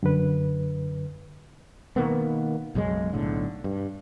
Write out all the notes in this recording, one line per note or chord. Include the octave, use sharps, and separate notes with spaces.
F#2 D3 B4
B2 D#3 A#3 B3
B1 F#2 C#3 G#3
B1 A2 D3
G2